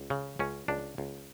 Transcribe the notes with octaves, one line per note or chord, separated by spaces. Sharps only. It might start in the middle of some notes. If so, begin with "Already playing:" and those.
Already playing: C#2
C#3
C#2 C#4
C#2 D4
C#2